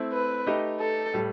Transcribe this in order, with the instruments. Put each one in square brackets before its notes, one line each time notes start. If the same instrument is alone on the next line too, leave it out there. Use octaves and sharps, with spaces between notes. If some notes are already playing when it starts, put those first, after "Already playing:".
Already playing: [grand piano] A3 C4 E4
[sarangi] B4
[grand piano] A3 D#4 G4 D#5
[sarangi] A4
[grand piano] A2 G3